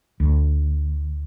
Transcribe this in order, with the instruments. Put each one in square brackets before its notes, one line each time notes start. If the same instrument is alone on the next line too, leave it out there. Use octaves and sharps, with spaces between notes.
[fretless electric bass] D2